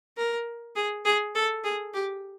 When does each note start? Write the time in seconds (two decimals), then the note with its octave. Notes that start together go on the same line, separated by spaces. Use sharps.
0.17 A#4
0.76 G#4
1.05 G#4
1.35 A4
1.64 G#4
1.94 G4